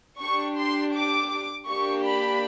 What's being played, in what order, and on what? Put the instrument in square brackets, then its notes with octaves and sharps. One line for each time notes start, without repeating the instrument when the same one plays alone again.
[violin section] D4 G4 C#6
C6
D6
A#3 D4 G4 C#6
B5